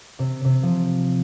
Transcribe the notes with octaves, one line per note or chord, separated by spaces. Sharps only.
C3
C3
F3